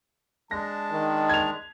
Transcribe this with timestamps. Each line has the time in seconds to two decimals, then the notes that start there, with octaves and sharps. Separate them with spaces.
0.51 G#3 D4 A5 A#6
0.91 D#3
1.29 G#6 F7